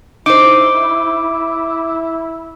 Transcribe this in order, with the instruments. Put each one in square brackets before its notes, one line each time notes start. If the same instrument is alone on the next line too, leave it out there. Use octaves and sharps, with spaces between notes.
[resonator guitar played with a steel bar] D#4 C5 [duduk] E4 [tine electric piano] D6